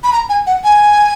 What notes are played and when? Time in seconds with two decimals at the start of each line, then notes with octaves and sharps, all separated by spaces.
0.04 B5
0.12 A#5
0.29 G#5
0.47 F#5
0.64 G#5